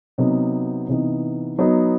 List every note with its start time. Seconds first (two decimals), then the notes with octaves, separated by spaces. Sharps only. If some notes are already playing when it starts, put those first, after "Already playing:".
0.18 C3 F#3 B3 D#4
0.88 C3 E3 B3 D#4
1.59 F#3 B3 D#4